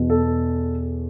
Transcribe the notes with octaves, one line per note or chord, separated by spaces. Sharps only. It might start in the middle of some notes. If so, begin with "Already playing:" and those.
Already playing: E2 B2
A4